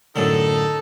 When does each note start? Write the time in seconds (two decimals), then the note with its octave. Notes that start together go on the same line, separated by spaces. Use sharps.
0.16 F#2 A2 D3 D#4 A4